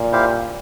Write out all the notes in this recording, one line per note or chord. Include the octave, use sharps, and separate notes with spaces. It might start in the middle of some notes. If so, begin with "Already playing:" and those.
Already playing: A#2
E4 G4 C5 F5